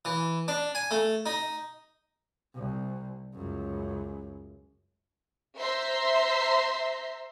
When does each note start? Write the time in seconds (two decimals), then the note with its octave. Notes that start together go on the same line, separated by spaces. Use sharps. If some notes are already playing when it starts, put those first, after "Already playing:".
0.05 E3
0.48 D4
0.75 G#5
0.91 A3
1.26 D#4
2.55 C2
3.34 C#2 F#2
5.60 C5 E5 A#5 C6